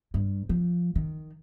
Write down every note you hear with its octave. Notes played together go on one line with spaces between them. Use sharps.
G2
F3
D#3